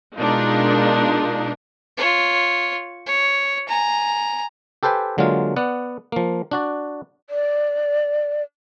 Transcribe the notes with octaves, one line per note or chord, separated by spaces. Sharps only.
B2 G#3 D4 D#4 F4 A#4
F4 C#5
C#5
G#5 A#5
G4 A4 B4 C5 G5 G#5
D3 F#3 G#3 A#3 F4
B3 D5 F#5
F3 A#3
D4 F#4 D5
D5